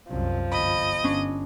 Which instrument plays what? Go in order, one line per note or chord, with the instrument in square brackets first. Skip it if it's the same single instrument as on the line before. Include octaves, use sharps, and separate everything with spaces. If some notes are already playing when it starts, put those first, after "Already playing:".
[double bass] C2 F#2 [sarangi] F3
[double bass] G1 [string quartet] D#5 [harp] B5
[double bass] G1 [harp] C#4 D4